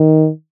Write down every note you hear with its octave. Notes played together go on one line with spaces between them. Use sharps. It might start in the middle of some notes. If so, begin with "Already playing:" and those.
Already playing: D#3